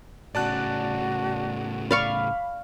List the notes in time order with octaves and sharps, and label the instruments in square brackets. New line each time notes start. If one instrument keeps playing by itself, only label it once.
[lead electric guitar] A2 C#3 [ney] F#4 [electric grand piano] D5 A5 F#6
[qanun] D5 F5 C#6 [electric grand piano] B5